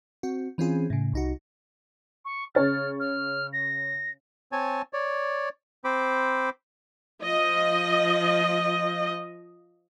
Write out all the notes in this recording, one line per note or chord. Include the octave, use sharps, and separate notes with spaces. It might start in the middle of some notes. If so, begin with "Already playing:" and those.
C4 F#4
E3 C4 C#4 F4 G#4
A2 C#3
C2 D#4 F#4
C#6
C#3 C#5 F6 A6
F6
A#6
C4 C#5 G#5 A5
C#5 D5
C4 C5 B5 D6
F3 D#5